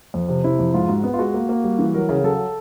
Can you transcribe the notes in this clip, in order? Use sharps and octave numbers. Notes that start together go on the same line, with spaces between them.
F2
C3
C3 E4
F2
G#2 F4
G#2 F#4
B3
F4
G#3 F#4
A#3
A#3
G3
E3
F#3 A#4
C#3
F#3 A4